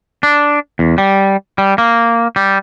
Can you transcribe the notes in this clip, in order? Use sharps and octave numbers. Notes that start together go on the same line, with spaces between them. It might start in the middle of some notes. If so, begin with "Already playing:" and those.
D4
E2
G3
G3
A#3
G3